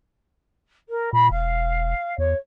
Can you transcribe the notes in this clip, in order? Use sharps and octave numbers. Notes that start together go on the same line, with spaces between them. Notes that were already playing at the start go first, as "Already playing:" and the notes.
A#4
A#2 B5
E1 F5
E2 C#5